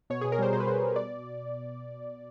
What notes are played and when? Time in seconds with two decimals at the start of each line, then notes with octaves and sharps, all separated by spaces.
0.10 B2 C#5
0.21 B2 G#4
0.32 A#4
0.39 G3 C5
0.53 B2 C5
0.60 B4
0.67 B2 C5
0.82 G3
0.96 B2 D5